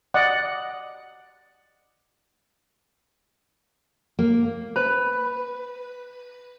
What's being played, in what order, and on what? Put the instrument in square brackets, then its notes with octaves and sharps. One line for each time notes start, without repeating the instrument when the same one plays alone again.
[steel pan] D5 D#5 F#5
[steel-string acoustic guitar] A#3
[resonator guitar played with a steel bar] B4 [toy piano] C5